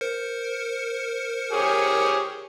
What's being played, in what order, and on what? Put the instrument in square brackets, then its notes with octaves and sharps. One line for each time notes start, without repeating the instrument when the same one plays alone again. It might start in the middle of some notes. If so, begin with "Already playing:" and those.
[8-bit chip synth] A#4 C5 C#7
[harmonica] G4 G#4 C#5